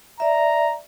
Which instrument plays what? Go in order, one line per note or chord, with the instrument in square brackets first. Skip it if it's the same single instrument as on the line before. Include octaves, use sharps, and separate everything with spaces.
[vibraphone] D5 E5 [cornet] A#5